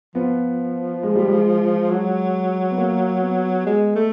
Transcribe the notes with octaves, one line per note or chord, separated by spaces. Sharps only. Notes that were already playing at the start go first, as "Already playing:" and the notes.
F3 B3
G#3
G3
G#3
F#3
B3
A#3
B3
G#3
A3